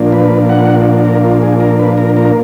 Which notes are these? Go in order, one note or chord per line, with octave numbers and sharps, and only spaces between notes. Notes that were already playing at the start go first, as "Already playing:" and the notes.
Already playing: A#2 F3 A#3 D4
B4
F#5
A#4
F4
G#4
A#4
B4
A#4
A#4